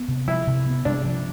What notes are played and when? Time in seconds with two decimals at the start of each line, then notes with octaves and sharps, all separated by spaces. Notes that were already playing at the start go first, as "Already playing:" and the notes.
Already playing: B3
0.08 C3
0.27 F3 E4
0.47 C3
0.66 B3
0.85 C3 D4
1.05 F3